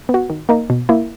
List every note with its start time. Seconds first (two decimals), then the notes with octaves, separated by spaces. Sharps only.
0.09 B3
0.14 F#4
0.30 D#3
0.49 A#3 D#4 A#4
0.70 B2
0.89 A#3 E4